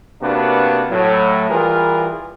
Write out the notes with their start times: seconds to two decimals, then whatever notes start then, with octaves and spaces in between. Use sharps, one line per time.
0.22 C3 A#3 B3 D4 F#4 B4
0.91 A2 F#3
1.50 E3 G3 F4 G#4 A#4 B4